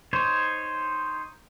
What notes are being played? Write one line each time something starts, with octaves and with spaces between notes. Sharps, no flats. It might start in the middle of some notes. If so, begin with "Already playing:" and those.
D#4 C5 C#5